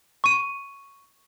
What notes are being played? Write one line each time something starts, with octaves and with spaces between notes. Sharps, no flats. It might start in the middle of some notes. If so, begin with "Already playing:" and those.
C#6 D#7